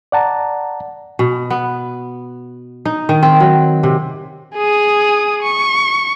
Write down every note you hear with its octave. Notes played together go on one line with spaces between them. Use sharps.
D5 F#5 A5 A#5
B2
B3
D#4
D#3
C4
F#3
C3
G#4 D#6
C#6